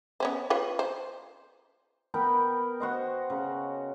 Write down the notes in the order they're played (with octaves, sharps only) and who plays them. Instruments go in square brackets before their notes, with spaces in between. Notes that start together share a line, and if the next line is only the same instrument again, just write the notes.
[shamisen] B3 C#4 C5
F4 B4 C#5
C5
[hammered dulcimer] B3 A#4 G5 B5
F#4 C5 D#5
C#3